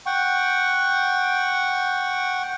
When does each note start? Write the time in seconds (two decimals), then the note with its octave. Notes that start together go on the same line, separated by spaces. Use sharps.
0.06 F#5 G5 C#6